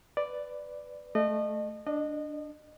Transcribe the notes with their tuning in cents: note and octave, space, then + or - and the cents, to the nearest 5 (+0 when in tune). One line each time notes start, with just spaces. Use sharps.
B4 +10 D5 +0
A3 -15 D#5 -30
D4 +5 D#5 -25